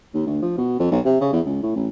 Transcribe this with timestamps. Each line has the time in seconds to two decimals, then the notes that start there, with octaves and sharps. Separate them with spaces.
0.14 D#2
0.26 D2
0.42 F3
0.58 B2
0.79 F2
0.92 B1
1.05 C3
1.21 C#3
1.33 E2
1.46 C#2
1.63 A2
1.76 A1